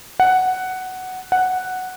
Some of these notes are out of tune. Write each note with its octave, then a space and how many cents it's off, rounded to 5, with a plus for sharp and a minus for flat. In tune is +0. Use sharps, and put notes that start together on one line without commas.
F#5 +5
F#5 +0